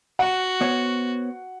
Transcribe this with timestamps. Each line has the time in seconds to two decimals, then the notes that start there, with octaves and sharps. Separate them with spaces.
0.19 F#4 F#5
0.61 B3 C5 C#5